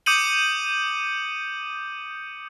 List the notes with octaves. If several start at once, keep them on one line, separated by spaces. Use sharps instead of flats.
D6 D#6 G6 C#7 D#7 F#7